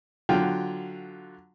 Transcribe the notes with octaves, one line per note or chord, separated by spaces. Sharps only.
D3 F#3 F4 G5